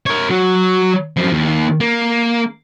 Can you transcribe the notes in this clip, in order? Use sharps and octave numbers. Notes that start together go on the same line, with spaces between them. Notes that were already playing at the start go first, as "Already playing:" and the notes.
A#4 C#5
F#3
F#2 F3
D#2
A#3